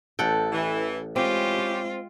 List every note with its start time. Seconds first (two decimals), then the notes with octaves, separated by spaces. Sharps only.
0.19 A1 A4 F#5 G5
0.52 E3
1.16 G#3 C4 C#4 E4 F4 G4